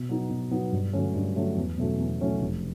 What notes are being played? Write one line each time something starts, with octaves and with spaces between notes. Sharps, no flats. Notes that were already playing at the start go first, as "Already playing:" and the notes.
Already playing: B2
F#3 B3 D#4
B2
F#3 B3 D#4
G2
D3 F#3 A3 C#4
G2
D3 F#3 A3 C#4
E2
B2 F#3 A3 C#4
E2
B2 F#3 A3 C#4
F1